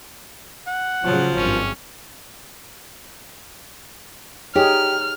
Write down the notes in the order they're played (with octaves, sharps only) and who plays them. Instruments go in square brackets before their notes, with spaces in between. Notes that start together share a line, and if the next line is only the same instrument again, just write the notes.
[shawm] F#5
[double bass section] A2 C#3 F#3 [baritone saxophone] F3
[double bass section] G#1 G2 [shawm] C#4
[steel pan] D#4 G#4 C#5 [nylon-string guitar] G4 [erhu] F6